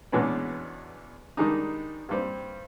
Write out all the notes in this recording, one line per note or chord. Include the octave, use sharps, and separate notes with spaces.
E2 B2 G#3 C#4 D4 B4
D#3 G3 G#3 D4 D#4
G2 G3 C4